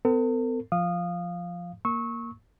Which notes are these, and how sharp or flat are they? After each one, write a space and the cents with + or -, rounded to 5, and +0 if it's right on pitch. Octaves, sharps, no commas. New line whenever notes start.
B3 +45 A4 +45
F3 +0 F5 +0 D#6 -20
A#3 +0 C#6 -15 E6 -35